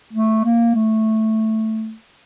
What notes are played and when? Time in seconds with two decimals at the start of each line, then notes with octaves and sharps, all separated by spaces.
0.13 A3
0.44 A#3
0.75 A3